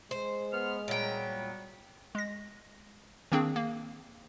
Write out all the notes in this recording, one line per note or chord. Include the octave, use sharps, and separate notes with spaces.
G#3 C5
B3 F6
A#2 F#3 G3 B3 G5
G#3 A#6
D#3 A#3 C4 D4 G#4
A#3